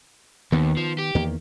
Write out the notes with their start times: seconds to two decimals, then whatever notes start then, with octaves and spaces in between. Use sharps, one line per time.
0.52 D#2 D#3 B3
0.77 F3
0.99 G4
1.15 E2 D#3 A#3